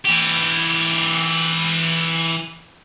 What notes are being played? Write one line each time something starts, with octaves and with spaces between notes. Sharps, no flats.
E3 G4